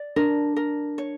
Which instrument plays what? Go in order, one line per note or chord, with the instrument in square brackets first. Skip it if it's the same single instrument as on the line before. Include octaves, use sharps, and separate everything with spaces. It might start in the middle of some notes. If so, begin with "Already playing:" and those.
Already playing: [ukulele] D5
[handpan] D4 [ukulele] A#4
[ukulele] A#4
C#5